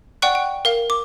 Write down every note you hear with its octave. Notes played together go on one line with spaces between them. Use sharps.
D5 F#5 G5 C#6 F#6
G5
A#4 F5
D6